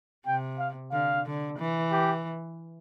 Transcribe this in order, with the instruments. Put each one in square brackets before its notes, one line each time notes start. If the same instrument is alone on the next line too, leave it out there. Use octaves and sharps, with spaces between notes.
[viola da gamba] C3 [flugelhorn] G5
[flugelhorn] F5
[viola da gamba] D3 [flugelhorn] F5
[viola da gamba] D3
E3
[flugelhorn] G4